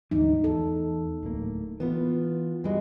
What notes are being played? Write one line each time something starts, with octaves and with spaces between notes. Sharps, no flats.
D2 G#2 E3 D#4
E2 A4
D1 A2 A#3
E3 B3 F4 B4
G2 E3 G3 G#3 F#4